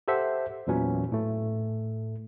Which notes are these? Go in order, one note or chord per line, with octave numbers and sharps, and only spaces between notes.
G4 A4 C5 E5 F#5
E2 A#2 E3 F#3 C#4
A2 A3